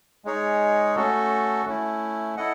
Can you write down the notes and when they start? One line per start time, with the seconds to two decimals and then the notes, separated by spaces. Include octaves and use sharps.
0.25 G#3 D#4 G#4 C#5
0.96 A3 C#4 F#4 A4
1.66 A3 C#4 E4
2.37 E4 A4 D#5 F#5